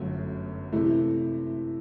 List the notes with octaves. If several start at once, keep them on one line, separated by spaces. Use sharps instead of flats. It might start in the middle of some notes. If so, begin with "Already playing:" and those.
Already playing: G1 F#2 F#3 A3
C3 E3 A3 E4